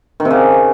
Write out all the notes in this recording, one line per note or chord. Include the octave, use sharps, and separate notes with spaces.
D#3
C3
C#3